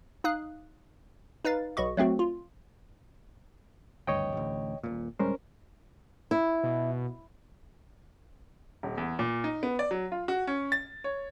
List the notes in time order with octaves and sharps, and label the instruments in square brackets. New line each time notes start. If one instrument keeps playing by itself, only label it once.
[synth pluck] D#4 F5 D#6 F#6
D#4 B4 F5 A6
B1 F#4 D#5 C#6
F#3 A3 C4 F#4
F4
[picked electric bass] G#1 D2 G2 [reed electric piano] C#5 D#5 G5
[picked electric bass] A1 D2
D#1 A#2
[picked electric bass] D1 G3 G#3 [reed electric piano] C#4 A#4 C5
[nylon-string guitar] E4
[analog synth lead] B2
[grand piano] D#1
E2
A#2
D#4
B3
D5
F#3
F4
F#4
C#4
A6
C#5